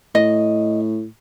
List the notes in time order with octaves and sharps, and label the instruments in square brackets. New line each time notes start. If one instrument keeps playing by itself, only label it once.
[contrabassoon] A2 [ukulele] D#5